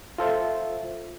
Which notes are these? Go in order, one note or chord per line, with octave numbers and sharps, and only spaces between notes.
F4 A4 C5 E5